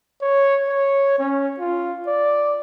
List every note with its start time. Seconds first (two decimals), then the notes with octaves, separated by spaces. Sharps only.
0.22 C#5
0.68 C#5
1.19 C#4
1.60 F4
2.07 D5